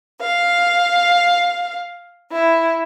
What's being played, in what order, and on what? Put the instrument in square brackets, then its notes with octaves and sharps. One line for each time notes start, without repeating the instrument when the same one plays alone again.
[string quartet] F5
E4